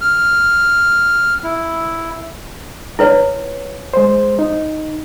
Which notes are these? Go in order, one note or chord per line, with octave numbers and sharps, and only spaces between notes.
F6
E4
E4 B4 C#5
G#3 C5
D#4